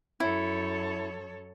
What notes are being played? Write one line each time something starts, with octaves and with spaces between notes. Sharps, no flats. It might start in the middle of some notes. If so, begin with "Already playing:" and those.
F#2 E4 A4 C#5